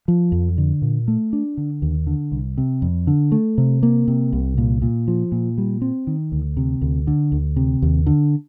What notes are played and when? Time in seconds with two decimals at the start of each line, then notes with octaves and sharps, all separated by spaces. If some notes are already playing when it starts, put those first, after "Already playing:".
0.08 F3
0.32 F2
0.58 D3
0.82 A#2
1.08 A3
1.33 D4
1.57 D3
1.82 D#2
2.07 D3
2.32 C2
2.58 C3
2.82 F2
3.07 D3
3.32 A3
3.58 C3
3.83 A#3
4.08 C3
4.33 C2
4.58 A#2
4.82 A#2
5.08 F3
5.32 A#2
5.58 G3
5.82 C4
6.07 D#3
6.32 D2
6.57 C3
6.82 D2
7.07 D3
7.32 D2
7.57 C3
7.82 D#2
8.06 D3